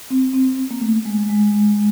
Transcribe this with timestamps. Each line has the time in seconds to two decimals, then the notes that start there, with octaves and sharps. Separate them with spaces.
0.10 C4
0.33 C4
0.71 A#3
0.81 A3
1.05 G#3
1.29 G#3